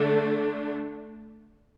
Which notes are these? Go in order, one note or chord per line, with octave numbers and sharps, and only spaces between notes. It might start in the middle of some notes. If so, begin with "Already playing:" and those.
Already playing: D3 A3 D4